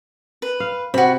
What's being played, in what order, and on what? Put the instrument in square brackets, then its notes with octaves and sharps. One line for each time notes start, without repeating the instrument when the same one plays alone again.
[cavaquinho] B4
[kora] F5
[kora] C3 [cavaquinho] F#4 B5